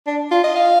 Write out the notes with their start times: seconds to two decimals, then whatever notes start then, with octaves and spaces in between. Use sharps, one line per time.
0.07 D4
0.31 F4
0.44 D#5
0.56 F5